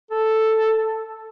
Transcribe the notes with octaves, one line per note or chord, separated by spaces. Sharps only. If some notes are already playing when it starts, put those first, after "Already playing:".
A4